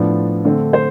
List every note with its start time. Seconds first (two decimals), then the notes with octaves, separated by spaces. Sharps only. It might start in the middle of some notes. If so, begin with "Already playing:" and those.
Already playing: A2 F3 B3 D4
0.45 D3 A3 C4
0.73 C5